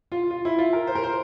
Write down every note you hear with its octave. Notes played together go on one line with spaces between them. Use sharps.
F4
F4
E4
F4
A#4
C5
A#4
C5